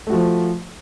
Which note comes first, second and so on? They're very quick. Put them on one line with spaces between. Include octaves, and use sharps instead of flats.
A3 F#4 F3